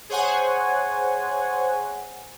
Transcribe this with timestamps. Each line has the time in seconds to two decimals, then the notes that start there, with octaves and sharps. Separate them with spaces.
0.09 G#4 C5 C#5 F#5 G#5